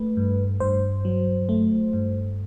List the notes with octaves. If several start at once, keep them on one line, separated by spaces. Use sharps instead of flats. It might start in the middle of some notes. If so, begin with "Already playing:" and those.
Already playing: A3 B4
G2
G2 C5
F#3
A3
G2